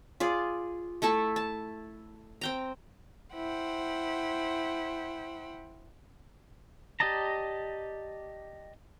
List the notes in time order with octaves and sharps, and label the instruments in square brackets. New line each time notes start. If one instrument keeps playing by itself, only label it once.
[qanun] F4 G#4 D5
A3 E4 A4 A5
A5
C4 G5 A#5
[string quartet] E4 C5 F#5 G5
[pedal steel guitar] G4 D5 D#5 A5 A#5